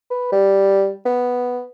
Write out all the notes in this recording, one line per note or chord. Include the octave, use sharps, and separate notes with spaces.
B4
G3
B3